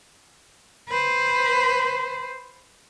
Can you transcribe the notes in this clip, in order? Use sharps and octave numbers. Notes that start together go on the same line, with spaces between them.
B4 C5